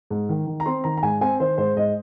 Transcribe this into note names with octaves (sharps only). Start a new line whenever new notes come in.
G#2
D#3
D#3
A#5
C4 C6
D#3 A#5
A#5
G#2 G#5
C4 G#5
D#3 C5
G#2 C5
G#2 D#5